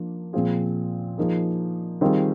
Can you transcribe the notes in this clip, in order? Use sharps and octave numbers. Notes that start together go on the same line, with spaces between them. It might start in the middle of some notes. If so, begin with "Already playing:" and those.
Already playing: F3 A#3 D4
A#2 F3 C4 F4 G#4
F3 A#3 D#4 G#4
D#3 G3 C4 F4 G#4